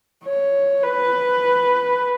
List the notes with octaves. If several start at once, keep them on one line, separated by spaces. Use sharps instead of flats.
C#5
B4